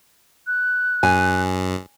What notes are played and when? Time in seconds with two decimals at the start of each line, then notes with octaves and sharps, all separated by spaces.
0.47 F#6
1.03 F#2 G#5